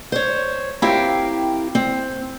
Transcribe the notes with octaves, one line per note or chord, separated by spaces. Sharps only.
C5 C#5
C4 E4 G4 A#4 F5 G5
C4